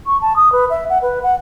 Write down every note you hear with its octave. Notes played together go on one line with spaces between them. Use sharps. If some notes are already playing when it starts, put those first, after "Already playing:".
C#6
A5
D#6
B4
E5
F#5
B4
F#5